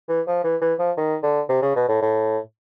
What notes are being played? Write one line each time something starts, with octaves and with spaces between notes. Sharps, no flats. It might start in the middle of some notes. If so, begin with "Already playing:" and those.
E3
F3
E3
E3
F3
D#3
D3
C3
C#3
B2
A2
A2